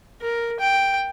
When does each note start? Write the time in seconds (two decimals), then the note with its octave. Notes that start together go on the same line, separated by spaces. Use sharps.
0.22 A#4
0.60 G5